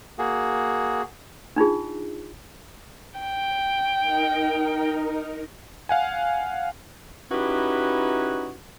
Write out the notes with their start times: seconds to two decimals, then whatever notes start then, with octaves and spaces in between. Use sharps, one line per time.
0.19 A#3 F#4 G#4
1.56 D4 D#4 F4 G#4
3.20 G5
3.98 D#4 A#4
5.89 F5 F#5 G#5
7.31 C#4 D#4 E4 F#4 G4 B4